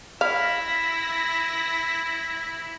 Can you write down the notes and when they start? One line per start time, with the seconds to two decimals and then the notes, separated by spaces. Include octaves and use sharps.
0.21 E4 F5 B5 E6 A#6